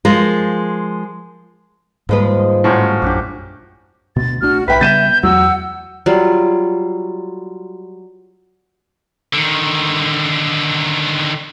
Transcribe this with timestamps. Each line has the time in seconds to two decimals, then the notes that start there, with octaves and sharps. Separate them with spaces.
0.05 F3 G#3 G#4 A#4
2.09 D#2 G#2 F3 G3 G#3 B4
2.64 A2 F#3 C#4 C5
3.02 A#1 F#2 D4 G4 F#5 D6
4.16 D2 B2 A6
4.41 C2 A3 D4 F#4 F6
4.68 B1 B4 E5 G5 B5 B6
4.81 C#3 G3 B3 G6 A6 D#7 E7
5.23 E2 F#3 F#5 E6
6.06 F#3 G3 F4
9.34 D3 D#3